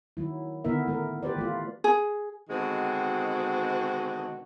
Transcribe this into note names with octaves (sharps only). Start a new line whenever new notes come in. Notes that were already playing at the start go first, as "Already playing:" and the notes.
D#3 F#3 E4
D3 D#3 B3 E4 A#4 E5
A3 A#4
G4 B4 C5 D5
E3 A3 F4
G#4
B2 D3 D#3 G#3 C4 F#4